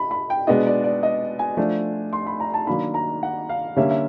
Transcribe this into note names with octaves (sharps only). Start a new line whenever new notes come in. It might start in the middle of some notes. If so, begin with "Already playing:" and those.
Already playing: B5
B5
G5
B2 G#3 B3 D4 D#5
D5
D5
D#5
G#5
F3 A3 D4
C6
B5
A#5
A5
D#3 F#3 A#3 D4 B5
A#5
F#5
F5
D3 G3 A#3 C#4 E5
E5